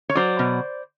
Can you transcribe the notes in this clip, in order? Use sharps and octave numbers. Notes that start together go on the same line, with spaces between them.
C#5
F#3 C5 D5
B2